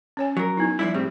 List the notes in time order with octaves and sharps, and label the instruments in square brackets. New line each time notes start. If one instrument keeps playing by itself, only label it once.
[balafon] C#4 C#5 G#5
[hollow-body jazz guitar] F#3 A#4
[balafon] B3 D#4 E4
[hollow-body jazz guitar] F3 D4 E4 [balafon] G3
[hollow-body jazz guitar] A2 G3 C4 [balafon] G#4